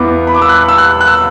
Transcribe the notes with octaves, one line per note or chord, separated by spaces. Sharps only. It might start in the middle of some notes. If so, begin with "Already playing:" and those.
Already playing: E2 E3 B3 D6
B5
D6
E6
F#6
E6
F#6
F#6
E6